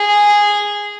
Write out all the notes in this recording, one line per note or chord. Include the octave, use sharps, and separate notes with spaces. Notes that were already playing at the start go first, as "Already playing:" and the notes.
Already playing: G#4